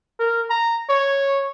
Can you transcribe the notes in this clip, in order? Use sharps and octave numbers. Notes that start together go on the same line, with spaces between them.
A#4
A#5
C#5